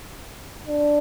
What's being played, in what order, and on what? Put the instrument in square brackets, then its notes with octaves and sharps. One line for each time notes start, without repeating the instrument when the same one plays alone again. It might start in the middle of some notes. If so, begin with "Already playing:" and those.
[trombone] D4